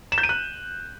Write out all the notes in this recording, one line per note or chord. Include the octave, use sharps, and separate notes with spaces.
E7
G6
D#7
F#6